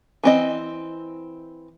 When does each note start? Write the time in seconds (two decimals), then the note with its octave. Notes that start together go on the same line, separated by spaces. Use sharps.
0.24 E3 C4 D#5